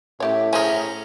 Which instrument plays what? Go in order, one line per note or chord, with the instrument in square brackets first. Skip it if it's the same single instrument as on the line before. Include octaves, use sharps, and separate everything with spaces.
[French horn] A2 [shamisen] C#4 G4 C#5 [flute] E5
[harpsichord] C#4 A#4 [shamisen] G#4 C5 G#5